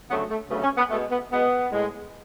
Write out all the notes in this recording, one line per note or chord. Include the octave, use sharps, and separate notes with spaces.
D2 C#3 F#3 A3 B3
A3
D2 C#3 F#3 A3 B3
C#4
B3
B2 G#3 A3
B3
B2 G#3 B3
A2 G#3